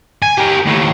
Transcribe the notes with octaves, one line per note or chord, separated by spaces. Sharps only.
G#5
G4 A#4
D#2 A2